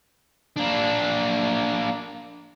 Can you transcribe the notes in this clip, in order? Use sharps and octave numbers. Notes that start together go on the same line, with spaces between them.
A#3 D4